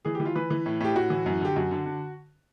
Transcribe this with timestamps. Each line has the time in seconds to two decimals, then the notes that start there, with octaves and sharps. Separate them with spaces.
0.05 E3 G#4
0.15 G4
0.20 E3
0.25 F4
0.35 E3 B4
0.50 E3
0.66 A2
0.81 A2 G4
0.96 A2 F#4
1.10 E3
1.26 F#2
1.41 D3 G4
1.56 F#2 F#4
1.71 D3
1.86 D3